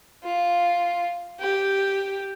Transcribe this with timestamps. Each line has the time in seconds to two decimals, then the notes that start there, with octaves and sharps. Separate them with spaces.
0.23 F4
1.40 G4